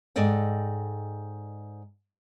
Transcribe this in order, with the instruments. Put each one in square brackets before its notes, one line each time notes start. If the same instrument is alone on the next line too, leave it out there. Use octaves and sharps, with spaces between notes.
[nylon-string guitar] G#2 A4 D5 D#5 G5